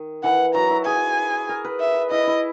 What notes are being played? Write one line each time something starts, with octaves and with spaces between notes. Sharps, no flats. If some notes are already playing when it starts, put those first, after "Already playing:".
Already playing: D#3
E3 F#5
F#3 A#5
E4
G#4 G#5
A#4
B4
E5
E4 D#5
E4